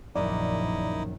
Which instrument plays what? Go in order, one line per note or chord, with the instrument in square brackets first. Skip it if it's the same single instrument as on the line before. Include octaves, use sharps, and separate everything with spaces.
[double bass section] A#1 [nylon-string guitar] F#2 D#3 [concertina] D#4 E4 [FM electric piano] D5